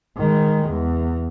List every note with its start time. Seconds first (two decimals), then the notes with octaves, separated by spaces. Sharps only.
0.17 D#3 G#3
0.69 E2